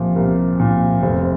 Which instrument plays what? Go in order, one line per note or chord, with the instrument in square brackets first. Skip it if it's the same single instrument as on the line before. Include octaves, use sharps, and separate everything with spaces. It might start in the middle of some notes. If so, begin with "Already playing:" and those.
Already playing: [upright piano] C2 A#2 F3
C2 A#4
A#2 F3
F1 C5